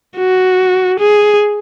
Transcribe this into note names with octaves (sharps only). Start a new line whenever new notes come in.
F#4
G#4